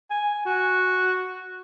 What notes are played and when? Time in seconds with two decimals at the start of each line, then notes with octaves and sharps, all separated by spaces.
0.10 G#5
0.45 F#4